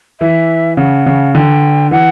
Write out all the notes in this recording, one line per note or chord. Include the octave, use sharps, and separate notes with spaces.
E3 E5
C#3 F#5
C#3
D3 G5
E3 F#5